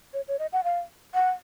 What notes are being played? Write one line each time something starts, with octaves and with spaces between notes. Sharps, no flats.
C#5
C#5
D#5
F#5
F5
F#5